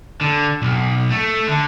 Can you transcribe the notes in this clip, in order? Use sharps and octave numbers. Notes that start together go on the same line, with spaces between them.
D3
B1
A3
D3